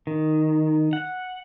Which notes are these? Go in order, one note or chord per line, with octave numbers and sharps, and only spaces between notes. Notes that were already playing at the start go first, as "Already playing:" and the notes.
D#3
F#5